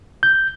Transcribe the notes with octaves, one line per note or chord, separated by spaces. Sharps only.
G6